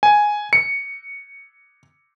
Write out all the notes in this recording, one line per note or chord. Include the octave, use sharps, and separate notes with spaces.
G#5
C#7